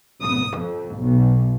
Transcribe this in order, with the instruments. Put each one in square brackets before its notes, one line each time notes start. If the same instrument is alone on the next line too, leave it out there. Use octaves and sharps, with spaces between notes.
[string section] D#6
F2
B1